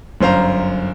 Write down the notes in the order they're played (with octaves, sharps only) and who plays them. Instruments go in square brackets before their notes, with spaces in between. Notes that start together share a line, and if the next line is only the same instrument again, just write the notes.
[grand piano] G1 F#2 C5 F5 A#5